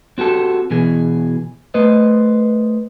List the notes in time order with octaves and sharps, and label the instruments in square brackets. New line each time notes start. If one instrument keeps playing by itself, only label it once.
[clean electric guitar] C4 F#4 G4 A4
B2 E3 G#4
A3 B4 C5 D#5